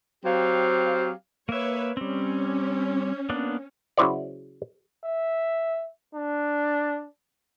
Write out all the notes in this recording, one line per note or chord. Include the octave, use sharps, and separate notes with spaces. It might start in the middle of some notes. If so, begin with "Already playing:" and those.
F#3 C4 G4 F5
A#3 B4 C#5 E5
G3 C4 C#4
A#3 B3 D4
C#3 F#3 E4 C5 D5
E5
D4